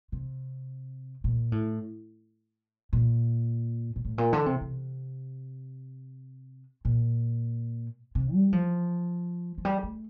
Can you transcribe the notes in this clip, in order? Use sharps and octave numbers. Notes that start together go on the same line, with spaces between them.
C3
A#2
A2
A#2
A#2
A2
A#2
D3
C3
C3
A#2
C3
G3
F3
F3
G3
A3